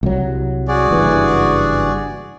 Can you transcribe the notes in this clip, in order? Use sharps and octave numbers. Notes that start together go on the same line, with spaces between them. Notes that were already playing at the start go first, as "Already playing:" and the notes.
C2 F#3
F#4 G#4 D5
F#1 G2 E3